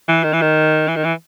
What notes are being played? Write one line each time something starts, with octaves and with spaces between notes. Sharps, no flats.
E3
D#3
E3
D#3
E3
D#3
E3